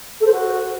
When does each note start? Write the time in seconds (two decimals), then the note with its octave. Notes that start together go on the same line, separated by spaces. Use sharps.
0.20 A4
0.26 C5
0.32 F#4